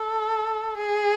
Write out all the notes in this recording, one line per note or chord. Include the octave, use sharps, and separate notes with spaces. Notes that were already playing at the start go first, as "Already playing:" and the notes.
Already playing: A4
G#4